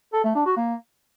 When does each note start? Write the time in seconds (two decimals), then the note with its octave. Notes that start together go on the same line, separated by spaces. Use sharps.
0.13 A4
0.24 A3
0.35 D4
0.46 F#4
0.56 A#3